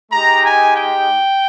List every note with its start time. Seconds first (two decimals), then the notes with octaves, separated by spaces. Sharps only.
0.12 G#3 D#4 G4 A#5
0.43 G#5
0.73 G5